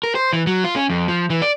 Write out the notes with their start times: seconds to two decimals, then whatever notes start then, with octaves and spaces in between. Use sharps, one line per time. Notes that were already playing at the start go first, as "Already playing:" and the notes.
0.03 A#4
0.15 C5
0.33 E3
0.47 F#3
0.64 F4
0.76 C#4
0.90 F2
1.08 F3
1.30 E3
1.42 D5